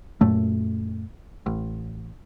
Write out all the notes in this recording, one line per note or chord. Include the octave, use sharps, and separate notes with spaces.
F#2 A#2 A3
A1